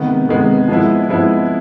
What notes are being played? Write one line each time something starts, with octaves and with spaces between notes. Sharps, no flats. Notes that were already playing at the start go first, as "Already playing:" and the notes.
Already playing: C3 D#3 G#3 B3
C3 D#3 G#3 B3
F3 G#3 B3 E4
F3 G#3 B3 E4